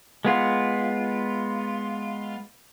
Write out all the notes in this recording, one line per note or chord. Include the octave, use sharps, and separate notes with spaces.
G#3 B3 F4